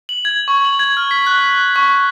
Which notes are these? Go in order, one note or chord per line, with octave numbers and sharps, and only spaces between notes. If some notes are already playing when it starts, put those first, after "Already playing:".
F#7
G#6
C#6
F#7
G#6
F6
B6
F#6
C#6